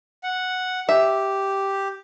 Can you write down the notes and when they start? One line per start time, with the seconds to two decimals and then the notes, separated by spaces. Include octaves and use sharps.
0.23 F#5
0.89 G4 E5